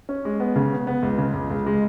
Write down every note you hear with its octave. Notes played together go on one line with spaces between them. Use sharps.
C#4
G#3
B3
C#3
B3
B3
C#2
C#3
C#2
C#2
G#3